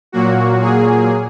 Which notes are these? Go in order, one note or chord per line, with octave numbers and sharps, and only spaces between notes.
A#2 F#3 A#3 F#4
G#4